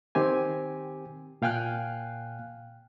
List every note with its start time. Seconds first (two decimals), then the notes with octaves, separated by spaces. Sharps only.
0.15 D#3 C4 G4 G#5
1.42 A#2 F5 G5 G#5 F6 F#6